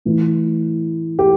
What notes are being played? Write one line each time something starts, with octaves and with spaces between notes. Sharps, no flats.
A2 E3
G4